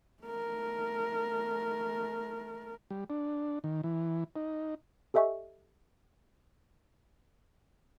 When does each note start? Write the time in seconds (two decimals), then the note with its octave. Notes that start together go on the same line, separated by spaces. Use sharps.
0.23 A3 A#4
2.91 G3
3.10 D4
3.64 D#3
3.83 E3
4.36 D#4
5.14 G4 A4 D#5 E5 G#5 C#6